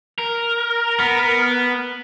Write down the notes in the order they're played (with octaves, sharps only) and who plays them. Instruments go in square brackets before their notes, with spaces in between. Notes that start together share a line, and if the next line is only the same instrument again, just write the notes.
[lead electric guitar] A#4
[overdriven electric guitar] B3